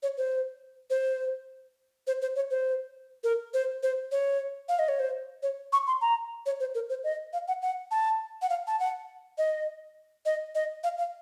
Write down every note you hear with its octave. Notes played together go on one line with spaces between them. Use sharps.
C#5
C5
C5
C5
C5
C#5
C5
A#4
C5
C5
C#5
F5
D#5
C#5
C5
C#5
C#6
C6
A#5
C#5
C5
A#4
C5
D#5
F5
F#5
F#5
A5
F#5
F5
A5
F#5
D#5
D#5
D#5
F5
F5